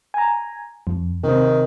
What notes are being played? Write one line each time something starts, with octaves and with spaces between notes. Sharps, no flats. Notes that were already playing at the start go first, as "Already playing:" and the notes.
G#5 A#5
F2
C3 D#3 C4